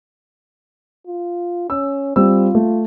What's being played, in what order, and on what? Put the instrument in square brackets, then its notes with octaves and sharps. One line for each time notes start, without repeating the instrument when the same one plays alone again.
[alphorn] F4
[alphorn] C#4 [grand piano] E6
[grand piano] G3 C4 E6 [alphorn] F4
[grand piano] A3